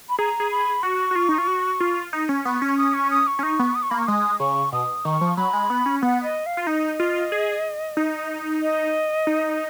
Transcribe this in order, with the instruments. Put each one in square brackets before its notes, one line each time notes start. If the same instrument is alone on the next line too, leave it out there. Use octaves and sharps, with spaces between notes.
[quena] B5
[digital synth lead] G#4 [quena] A#5
[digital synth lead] G#4
[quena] B5
[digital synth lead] F#4 [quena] C#6
[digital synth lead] F#4
F4
D#4
F4
F#4
F4
D#4
C#4
[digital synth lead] B3 [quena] C#6
[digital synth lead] C#4 [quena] C#6
[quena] D#6
C#6
D#6
C#6
[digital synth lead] C#4
[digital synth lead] D#4 [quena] C#6
[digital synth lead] B3
[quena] D#6
C#6
[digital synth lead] A#3 [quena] B5
[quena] C#6
[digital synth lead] G#3 [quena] D#6
[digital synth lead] C#3 [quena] C#6
[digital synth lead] B2 [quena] D#6
[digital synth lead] D#3 [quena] C#6
[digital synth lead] F3
[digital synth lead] F#3 [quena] B5
[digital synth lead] G#3
B3
C#4
[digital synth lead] B3 [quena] F#5
[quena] D#5
F5
[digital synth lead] F4
[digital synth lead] D#4 [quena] D#5
[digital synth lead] F4
G#4
D#4
[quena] D#5
[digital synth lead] D#4